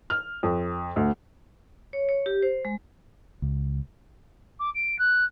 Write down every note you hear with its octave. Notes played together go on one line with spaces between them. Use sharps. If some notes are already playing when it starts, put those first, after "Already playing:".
F6
F2
D2
C#5
C#5
G4
C5
G#3
C#2
D6
D7
F#6